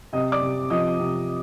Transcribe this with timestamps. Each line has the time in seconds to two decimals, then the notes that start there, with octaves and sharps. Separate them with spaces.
0.13 C3 D#5 D#6
0.32 D5 D6
0.42 C3
0.70 F3 D#5 D#6
0.99 C3